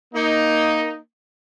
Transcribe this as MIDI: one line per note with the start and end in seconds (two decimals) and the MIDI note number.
0.14 0.97 58
0.14 0.97 63